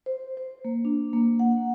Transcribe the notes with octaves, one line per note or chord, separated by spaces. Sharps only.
C5
C5
A#3
D4
A#3
F#5